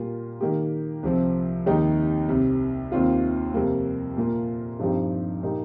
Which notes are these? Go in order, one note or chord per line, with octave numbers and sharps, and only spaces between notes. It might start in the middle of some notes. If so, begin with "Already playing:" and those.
Already playing: A#2 G3 A#3 F4
D#3 A#3 G4
C2 C3 F3 C4
D#2 D#3 G3 D#4 G4
C2 C3 G3
D#2 D#3 C4 F4
F2 C3 G3 A#3
A#2 A#3 F4
G2 F3 C4 D#4 G4
A#2 A#3 D#4 G4